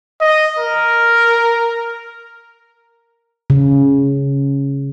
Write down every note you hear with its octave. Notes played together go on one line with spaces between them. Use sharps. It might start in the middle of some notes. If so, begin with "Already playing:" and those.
D#5
A#4
C#3